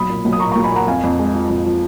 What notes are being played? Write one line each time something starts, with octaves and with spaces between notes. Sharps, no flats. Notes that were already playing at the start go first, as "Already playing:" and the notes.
Already playing: B1 B5 D#6
A#2
B1
D#6
A#2 A#5 C#6
A#5 C#6
B1
G#5 B5
A#2 F#5 A#5
F2 F5 G#5
F2
G#3
F3
F2
F3